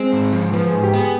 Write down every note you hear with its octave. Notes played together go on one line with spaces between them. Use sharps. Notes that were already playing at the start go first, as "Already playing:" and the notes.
Already playing: G#3 C4
G#2
F3
F3 B3
G#2 G#4
G4
B3 G#4